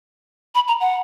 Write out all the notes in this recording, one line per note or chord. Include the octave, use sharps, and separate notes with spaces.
B5
A#5
F#5